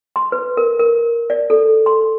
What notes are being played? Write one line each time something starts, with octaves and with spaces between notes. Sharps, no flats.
C6
B4
A#4
A#4
D5
A4
C6